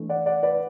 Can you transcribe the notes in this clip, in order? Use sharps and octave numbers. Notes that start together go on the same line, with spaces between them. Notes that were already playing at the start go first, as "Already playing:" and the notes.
Already playing: E3 A3 D4
D5 F#5
D5 F#5
B4 D5